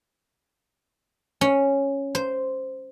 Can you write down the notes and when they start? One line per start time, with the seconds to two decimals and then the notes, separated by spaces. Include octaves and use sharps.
1.41 C#4
2.15 C5